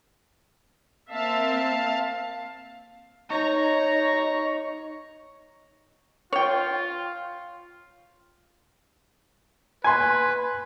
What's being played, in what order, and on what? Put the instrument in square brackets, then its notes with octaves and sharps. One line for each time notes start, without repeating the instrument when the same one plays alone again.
[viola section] A#3 C4 E5 [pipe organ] F5 A5
[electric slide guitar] D#4 [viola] C#5 A#5 [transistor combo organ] C#6
[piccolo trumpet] F4 [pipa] C#5 G5
[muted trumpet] B4 [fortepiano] G#5 C6